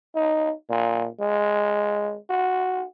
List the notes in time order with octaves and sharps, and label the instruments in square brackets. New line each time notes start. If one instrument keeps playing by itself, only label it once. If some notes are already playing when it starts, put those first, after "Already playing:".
[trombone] D#4
A#2
G#3
F#4